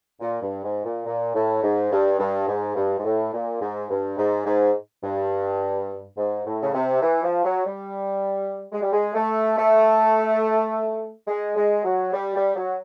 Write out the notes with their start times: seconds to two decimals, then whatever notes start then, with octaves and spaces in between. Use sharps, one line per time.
0.20 A#2
0.42 G2
0.63 G#2
0.84 A#2
1.06 A#2
1.34 A2
1.62 G#2
1.91 G2
2.19 G2
2.48 G#2
2.76 G2
2.99 G#2
3.04 A2
3.33 A#2
3.61 G#2
3.90 G2
4.18 G#2
4.46 G#2
5.03 G2
6.17 G#2
6.45 A2
6.63 C#3
6.74 C3
7.02 E3
7.22 F3
7.44 F#3
7.66 G3
8.72 G#3
8.82 G3
8.92 G#3
9.14 A3
9.57 A3
11.27 G#3
11.56 G#3
11.84 F#3
12.12 G3
12.35 G3
12.55 F#3